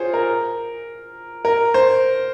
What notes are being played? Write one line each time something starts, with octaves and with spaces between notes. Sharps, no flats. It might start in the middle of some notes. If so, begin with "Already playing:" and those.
Already playing: F4 G#4 C5 C#5
A#4
A#4
C5